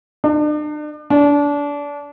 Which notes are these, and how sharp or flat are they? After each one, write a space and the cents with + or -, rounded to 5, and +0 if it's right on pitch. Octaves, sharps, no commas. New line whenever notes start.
D4 +40
D4 -25